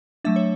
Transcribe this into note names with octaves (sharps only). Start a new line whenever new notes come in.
F#3 A3 D4 E5
C#5